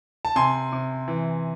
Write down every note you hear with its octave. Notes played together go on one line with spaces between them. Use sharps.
A5
C3 G#5 C6
C3
E3